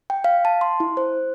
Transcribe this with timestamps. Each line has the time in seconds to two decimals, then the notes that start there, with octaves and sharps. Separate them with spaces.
0.10 G5
0.24 F5
0.45 A5
0.61 C6
0.80 E4
0.97 C5